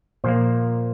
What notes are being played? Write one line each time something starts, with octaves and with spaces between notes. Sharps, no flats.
A#2 F3 A#3 C5